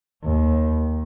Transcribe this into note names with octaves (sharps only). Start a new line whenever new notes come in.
D#2